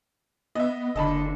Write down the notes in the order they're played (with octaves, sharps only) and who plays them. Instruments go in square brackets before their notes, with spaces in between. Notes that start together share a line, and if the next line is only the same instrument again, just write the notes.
[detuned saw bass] B3 [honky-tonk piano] D#5 E5
[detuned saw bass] F#1 [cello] D3 [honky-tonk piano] D#5 A5 B5